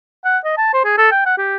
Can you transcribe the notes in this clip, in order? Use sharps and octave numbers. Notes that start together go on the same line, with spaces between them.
F#5
D#5
A5
C5
G#4
A4
G5
F#5
G4